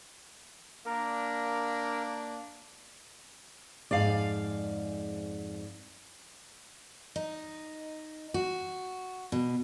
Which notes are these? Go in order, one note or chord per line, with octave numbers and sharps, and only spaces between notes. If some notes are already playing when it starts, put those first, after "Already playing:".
A#3 D4 A#4
F2 G#2 G#4 D5 F5
D#4
F#4
B2